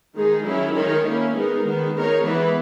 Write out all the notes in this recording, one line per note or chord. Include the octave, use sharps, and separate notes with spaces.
D#3 G#3 D#4 G#4
D#3 F#3 C#4 E4
D#3 G#3 D#4 A#4 C#5
A#3 C#4 E4
G#3 B3 D#4 A#4
D#3 G#3 B3
G#3 D#4 A#4 C#5
E3 G#3 B3 E4 B4